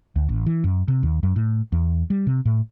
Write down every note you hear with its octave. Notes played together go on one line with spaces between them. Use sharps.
D2
A1
E3
F#2
C3
D#2
F#2
A2
E2
G3
C3
A2